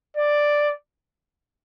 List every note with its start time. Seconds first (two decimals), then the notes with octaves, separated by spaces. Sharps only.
0.17 D5